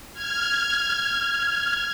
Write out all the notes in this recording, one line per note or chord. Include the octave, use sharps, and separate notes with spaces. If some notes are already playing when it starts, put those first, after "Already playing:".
F6 G#6